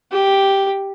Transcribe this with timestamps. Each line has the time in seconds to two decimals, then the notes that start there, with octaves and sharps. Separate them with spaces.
0.12 G4